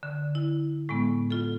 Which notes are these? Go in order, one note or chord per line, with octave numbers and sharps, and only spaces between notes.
D3
E4
A2 G#3 B3
F4 A4